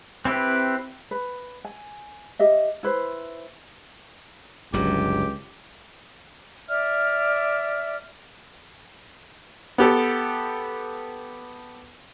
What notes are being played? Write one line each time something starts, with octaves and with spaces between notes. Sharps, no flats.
C4 E4 G4 B4
B4
G#5
G4 D#5 E5
E4 B4 C5
G1 C#2 D3 F#3 G4
D5 E5 F6
B3 G4 A4